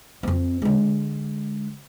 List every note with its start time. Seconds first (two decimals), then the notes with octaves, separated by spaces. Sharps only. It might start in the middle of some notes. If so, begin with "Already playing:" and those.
0.23 F2 C4
0.62 D3 G#3